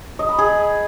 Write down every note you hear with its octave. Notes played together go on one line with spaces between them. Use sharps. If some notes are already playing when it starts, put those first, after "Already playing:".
D#5
B5
G#4